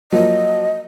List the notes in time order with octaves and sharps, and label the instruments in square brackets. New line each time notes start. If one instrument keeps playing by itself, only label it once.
[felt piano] F3 F#3 A#3 [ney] D#5